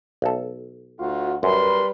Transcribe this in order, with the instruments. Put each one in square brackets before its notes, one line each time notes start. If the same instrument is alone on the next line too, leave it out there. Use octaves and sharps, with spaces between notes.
[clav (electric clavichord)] B1 A4
[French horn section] D2 F4 F#4
[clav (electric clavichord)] F#2 [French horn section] G3 A#4 B4 [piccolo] C6